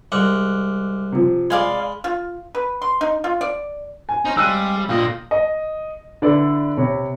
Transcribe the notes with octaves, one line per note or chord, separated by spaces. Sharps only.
C2 G#3 F#5 D6 F6 F#6
C3 F3
G#3 D5 F5 G#5 B5
F4
B4
C6
D#4
F4
D5
G#5
C#4 D#4 C5 A#5
G3 G#3 C4 F5 E6 F#6 D#7
A#2 D3 D#5 F5 G5
D#5
D3 E4 B4 D5
C3 C#5 B5